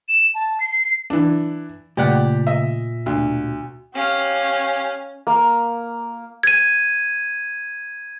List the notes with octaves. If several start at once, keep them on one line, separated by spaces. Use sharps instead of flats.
E7
A5
C7
E3 D4
A#2 C#3 A3 G4 D5 F#5
D#5 E5
D2 B2 F#4
C#4 G4 F5
A#3
G#6 D#7